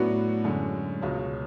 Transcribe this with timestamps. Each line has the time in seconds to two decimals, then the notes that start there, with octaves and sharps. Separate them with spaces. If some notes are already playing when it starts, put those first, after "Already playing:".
Already playing: A2 F#3 B3 D4 F#4
0.44 F#2 D3 G#3 C#4
1.01 C#2 B2 G#3 C#4